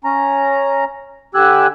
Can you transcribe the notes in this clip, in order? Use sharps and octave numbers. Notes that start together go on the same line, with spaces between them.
C#4 A#5
D3 G4 G#5 E6 F#6